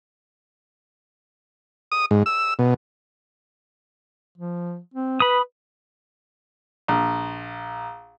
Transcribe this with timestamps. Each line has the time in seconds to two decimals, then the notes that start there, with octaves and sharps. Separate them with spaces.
1.92 D#6
2.11 G#2
2.26 E6
2.59 B2
4.38 F3
4.94 C4
5.20 B4 B5 D#6
6.88 A#1